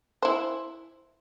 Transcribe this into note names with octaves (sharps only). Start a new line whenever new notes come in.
E4 C5